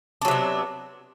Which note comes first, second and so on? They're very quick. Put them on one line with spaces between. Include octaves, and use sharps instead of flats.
D4 F#3 C3 B3